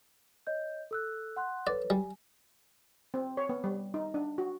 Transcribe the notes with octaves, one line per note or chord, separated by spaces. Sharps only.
C#5 D#5 G6
A4 E6 F#6
F#5 C6 F#6
A4 B4 C#5 D5
G3 G#5
C4
C#5
B3
G3
D#4
D4
F#4